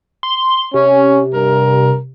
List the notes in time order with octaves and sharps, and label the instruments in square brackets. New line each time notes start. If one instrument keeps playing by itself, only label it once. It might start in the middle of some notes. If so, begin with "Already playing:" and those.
[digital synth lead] C6
[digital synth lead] C3 [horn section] C#4
[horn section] G2 A#4